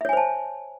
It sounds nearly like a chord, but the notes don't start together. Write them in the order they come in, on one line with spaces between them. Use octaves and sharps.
E5 C#5 G#5 C5 A5